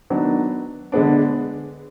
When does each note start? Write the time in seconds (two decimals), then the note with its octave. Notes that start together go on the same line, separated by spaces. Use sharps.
0.10 D#3 F#3 B3 D4
0.92 D3 G#3 B3 D4